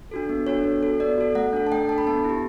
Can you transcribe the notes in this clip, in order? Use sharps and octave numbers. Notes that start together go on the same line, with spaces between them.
D4 F#4 A4
B3
D4 F#4 A4 C#5
B3
F#4 A4
B3 D5
F#4 A4
A3 F#5
D4 A4
A5
A3 G5
D4 A4 A5
B5
B3 A5
E4 G4